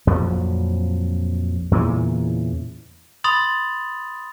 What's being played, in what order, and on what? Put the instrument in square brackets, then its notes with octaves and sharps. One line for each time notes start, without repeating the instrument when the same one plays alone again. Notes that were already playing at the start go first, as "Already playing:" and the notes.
[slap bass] A#1 F2 F3 F#3
E2 A#2 C#3 E3
[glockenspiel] B5 C6 D#6 A6 F7 F#7